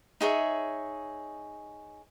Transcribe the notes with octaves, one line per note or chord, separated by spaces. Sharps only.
D#4 G#4 C#5 E5